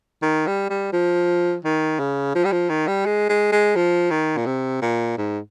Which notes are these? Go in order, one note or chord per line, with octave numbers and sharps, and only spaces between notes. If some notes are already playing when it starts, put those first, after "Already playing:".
D#3
G3
G3
F3
D#3
C#3
F3
G3
F3
D#3
G3
G#3
G#3
G#3
F3
D#3
A#2
C3
A#2
G#2